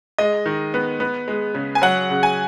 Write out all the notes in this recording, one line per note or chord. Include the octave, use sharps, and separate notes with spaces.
G#3 D#5
D#3
B3
B3
G#3
C#3
G#5
F#3 F#5
C#3
G#5